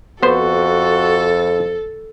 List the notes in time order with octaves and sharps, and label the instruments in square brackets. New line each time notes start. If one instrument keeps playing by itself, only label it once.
[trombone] F2 [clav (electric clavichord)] B3 C5 [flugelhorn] F#4 [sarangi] A4